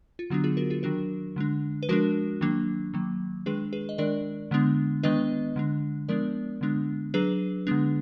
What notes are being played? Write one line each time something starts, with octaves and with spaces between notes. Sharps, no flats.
F4
D3 F#3 B3 D4 F#4
F4 G#4
F#4 A#4
F4 G#4
D#3 F#3 D4 F#4 A#4
D3 G#3 D4
B4
F3 G#3 D4 F#4 A#4
D#3 F#3 A#3 D4
D#3 F#3 A#3
D#3 G#3 D4 G#4 B4
G#4 B4
D#5
D#3 G#3 D4 A#4 D5
D3 G#3 B3 D4
D#3 G#3 B3 D4 B4 D#5
D3 G#3 D4
F3 G#3 B3 D4 A#4 D5
D3 G#3 B3 D4
F#3 D4 G#4 B4
D3 G#3 B3 D4